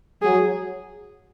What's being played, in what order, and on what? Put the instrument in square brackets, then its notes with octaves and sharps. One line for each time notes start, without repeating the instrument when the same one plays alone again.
[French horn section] F#3 [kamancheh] G#4